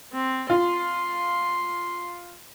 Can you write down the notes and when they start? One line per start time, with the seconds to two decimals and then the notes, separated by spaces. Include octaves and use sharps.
0.12 C4
0.50 F4 C6